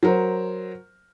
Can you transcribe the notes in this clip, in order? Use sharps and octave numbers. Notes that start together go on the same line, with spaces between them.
F#3 A#4 C5